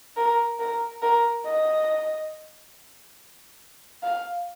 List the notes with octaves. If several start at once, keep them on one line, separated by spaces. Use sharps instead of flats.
A#4
A#4
A#4
D#5
F5